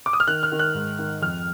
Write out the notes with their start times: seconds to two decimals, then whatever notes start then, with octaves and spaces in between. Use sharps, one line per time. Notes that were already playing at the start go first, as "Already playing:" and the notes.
0.06 D6
0.13 D#6
0.20 F6
0.27 D#3 F#6
0.43 F6
0.52 D#3
0.59 F#6
0.74 G#2
0.99 D#3
1.22 F2 F6